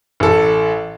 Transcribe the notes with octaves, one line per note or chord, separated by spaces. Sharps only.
A1 A4